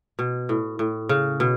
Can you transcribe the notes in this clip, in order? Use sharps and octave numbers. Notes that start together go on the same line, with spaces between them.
B2
A2
A2
C#3
B2